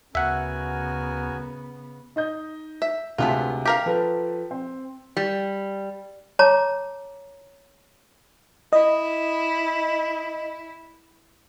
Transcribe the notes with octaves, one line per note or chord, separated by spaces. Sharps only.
D2 C#3 B3 F#4 A#4 E5 F#5 G#5
D#4 D#5 G6
E5
D2 C3 G#3 A3 B3 F4
G4 A#4 F5
F3 A4 B4
C4
G3
C#5 A5 A#5 D6
E4 D#5